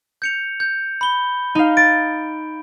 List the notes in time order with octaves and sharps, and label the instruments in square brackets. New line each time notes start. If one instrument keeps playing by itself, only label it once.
[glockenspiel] G6 C#7 F7
G6
B5 G7
[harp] D#4 F5
[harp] A6 [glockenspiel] D7